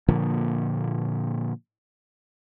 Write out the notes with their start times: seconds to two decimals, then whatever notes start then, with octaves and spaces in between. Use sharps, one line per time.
0.08 A#2 D3 F3 A#3